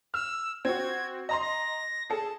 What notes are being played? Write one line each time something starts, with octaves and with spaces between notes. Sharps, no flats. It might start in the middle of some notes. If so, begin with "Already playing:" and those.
E6 F6
C4 F#4 G#6
D#5 A#5 C6 A#6
A#6
G#4 A4 A5